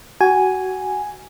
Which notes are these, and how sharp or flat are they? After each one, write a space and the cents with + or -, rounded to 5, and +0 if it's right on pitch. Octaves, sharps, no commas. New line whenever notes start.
F#4 +20 G#5 +0